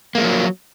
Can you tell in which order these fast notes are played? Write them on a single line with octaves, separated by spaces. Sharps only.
A#3 G#3 F3 F#3